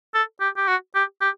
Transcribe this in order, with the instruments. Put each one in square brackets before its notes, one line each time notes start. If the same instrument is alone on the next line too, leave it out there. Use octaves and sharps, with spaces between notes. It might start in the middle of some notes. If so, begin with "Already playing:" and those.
[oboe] A4
G4
G4
F#4
G4
G4